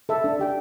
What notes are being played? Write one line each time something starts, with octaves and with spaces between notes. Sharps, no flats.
A4 E5
D4
G4 D5 G5